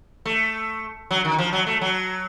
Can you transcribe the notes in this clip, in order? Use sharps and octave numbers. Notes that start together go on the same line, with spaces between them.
A3
F#3
D#3
F3
F#3
A3
F#3